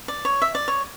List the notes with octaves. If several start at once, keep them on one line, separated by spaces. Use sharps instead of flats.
D5
C#5
E5
D5
C#5